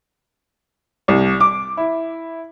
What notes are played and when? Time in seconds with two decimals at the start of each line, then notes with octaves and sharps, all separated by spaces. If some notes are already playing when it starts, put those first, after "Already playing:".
1.08 C2
1.40 D6
1.77 E4